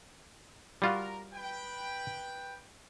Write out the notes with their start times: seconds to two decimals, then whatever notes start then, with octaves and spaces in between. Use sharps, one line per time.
0.82 G3 F4 F#4 A#4
1.33 B4 G5